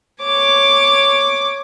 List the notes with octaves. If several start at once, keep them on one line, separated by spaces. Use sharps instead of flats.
C#5 D6